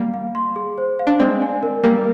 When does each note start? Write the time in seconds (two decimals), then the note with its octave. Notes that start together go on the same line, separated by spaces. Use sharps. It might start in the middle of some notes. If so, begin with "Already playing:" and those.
Already playing: G3 A#3
0.14 F5
0.35 C6
0.56 G#4
0.78 C5
0.99 F5
1.07 D4
1.19 G#3 C4 D5
1.42 G#5
1.63 A#4
1.83 G3 A#3 A#4